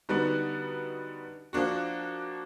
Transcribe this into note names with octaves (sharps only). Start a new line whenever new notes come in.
D3 G3 B3 D#4 F#4
F3 A#3 D4 F#4